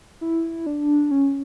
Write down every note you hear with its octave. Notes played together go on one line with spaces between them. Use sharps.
E4
D4
C#4